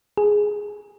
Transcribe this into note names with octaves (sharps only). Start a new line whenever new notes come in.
G#4